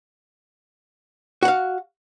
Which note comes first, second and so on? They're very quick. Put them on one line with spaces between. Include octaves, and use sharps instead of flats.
F#4 F#5 F5